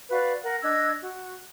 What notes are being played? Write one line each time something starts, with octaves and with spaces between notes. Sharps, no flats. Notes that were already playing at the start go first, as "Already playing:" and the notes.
F#4 B4 D5 F5
A#4 F#5 F#6
D4 D#5 E6 G#6
F#4